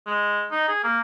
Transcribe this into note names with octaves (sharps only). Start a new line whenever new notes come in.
G#3
D#4
G#4
A#3